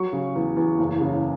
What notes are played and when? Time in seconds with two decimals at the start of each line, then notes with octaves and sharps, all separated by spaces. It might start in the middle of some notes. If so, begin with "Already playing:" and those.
Already playing: F#3 C#6
0.13 C#3
0.35 E2
0.57 E2
0.79 F#1
1.01 C#3